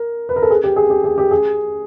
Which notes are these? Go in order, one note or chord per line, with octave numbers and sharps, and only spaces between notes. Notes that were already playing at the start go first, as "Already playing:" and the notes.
Already playing: A#4
B4
A#4
A4
G#4
G4
G#4
G4
G#4
G4
G#4